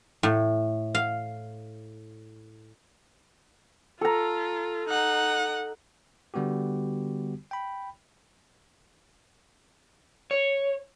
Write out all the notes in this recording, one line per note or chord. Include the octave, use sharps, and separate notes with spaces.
A2
F5
F4 A4 A#5
D#4 F#5
D3 G3 B3 F#4 G4
G5 B5
C#5